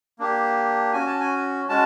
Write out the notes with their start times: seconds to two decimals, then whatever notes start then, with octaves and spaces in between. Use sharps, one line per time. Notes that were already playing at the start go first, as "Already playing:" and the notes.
0.19 A#3 D4 G4
0.93 C#4 F#4 G#5
1.06 A5
1.20 G#5
1.69 G#3 C#4 F#4 A5